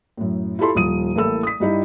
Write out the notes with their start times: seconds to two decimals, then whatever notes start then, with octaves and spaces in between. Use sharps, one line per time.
0.17 F#2 A2
0.59 E4 F4 G4 A4 B5 C6
0.75 D#1 F3 D#6 D#7
1.15 A1 A#3 E4 A4 E6
1.43 D#6 B6
1.60 G2 G3 D#4 E4